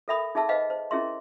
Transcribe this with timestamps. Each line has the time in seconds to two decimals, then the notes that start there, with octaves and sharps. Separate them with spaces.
0.08 A4 A#4 E5 G5 B5 D#6
0.35 D#4 G#4 E5 A5 E6
0.49 B4 C5 D#5 F5 G5
0.70 C5
0.91 C#4 E4 G#4 A#4 E5 C6